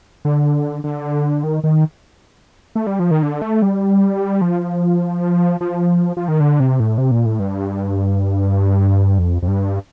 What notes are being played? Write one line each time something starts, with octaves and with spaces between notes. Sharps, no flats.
D3
D3
D#3
D#3
A3
G3
F3
D#3
D3
A3
G3
F3
F3
F3
D#3
D3
C3
A2
C3
A#2
A2
G2
F2
F2
G2